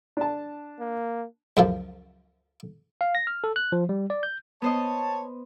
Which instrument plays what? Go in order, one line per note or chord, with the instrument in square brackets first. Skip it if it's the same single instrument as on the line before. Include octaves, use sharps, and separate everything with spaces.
[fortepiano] D4 A5
[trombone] A#3
[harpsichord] C#2 F#2 F3
[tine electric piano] F5
A#6
F6
A4
F#6
F3
G3
D5
G6
[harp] B3 C5 D#5 [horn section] C#5 A5